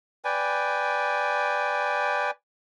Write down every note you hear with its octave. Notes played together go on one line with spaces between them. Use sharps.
B4 D5 G5 G#5